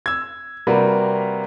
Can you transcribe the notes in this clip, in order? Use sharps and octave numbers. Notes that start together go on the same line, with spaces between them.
E6 G#6
C3 G3 A#3 F#4 A#4 B4